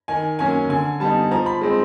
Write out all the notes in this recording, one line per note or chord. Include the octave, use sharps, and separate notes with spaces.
D#3 G#5
F#3 A#3 C#4 G#5
D3 G#5
G3 B3 D#4 A5
F3 A#5
B5
G#3 C4 D#4